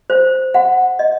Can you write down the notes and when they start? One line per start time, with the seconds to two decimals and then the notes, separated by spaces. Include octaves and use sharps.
0.10 C5
0.54 F#5
0.99 D#5